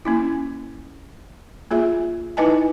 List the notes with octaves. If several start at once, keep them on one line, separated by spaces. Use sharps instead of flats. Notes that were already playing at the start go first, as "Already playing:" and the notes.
A#3 C#4 E4
A#3 F4 G#4 E5
D#4 E4 B4 D#5 G#5 A5